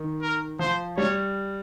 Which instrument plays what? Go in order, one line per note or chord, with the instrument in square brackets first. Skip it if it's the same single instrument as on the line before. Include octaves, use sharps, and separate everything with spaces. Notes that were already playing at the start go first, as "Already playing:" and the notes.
Already playing: [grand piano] D#3
[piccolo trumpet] A#4
[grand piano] F3 [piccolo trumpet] C5
[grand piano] G3 [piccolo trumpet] C#5